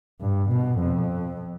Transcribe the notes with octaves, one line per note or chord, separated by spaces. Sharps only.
G2
B2
F2